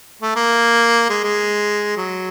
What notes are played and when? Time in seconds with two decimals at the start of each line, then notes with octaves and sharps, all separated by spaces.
0.22 A3
0.36 A#3
1.09 G#3
1.24 G#3
1.97 F#3